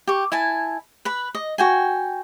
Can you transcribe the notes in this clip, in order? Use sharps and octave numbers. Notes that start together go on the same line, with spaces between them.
G4 C#6
E4 G#5 A5
B4 B5
D#5
F#4 G5 G#5